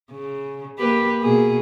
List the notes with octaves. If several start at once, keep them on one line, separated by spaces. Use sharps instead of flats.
C#3
A#3 G4 B4
B2 A#3 G#4